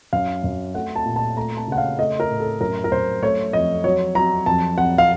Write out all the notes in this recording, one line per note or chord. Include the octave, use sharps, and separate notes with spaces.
F#2 F5
F#2
A3 F#5
A5
A#2
A5
A3 A#5
A5
C#3 F#5
F5
A3 D#5
A#4
A2
A4
F#2 A#4
A#4
F#2 C5
A3 C#5
F2 D#5
F#3 C#5
F#3 A#5
F2 A5
F2 F#5
F5